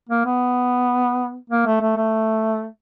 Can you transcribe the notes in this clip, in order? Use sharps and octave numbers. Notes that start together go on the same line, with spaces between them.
A#3
B3
A#3
A3
A3
A3